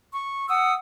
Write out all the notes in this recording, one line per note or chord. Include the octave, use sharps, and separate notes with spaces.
C#6
F#5 D#6 E6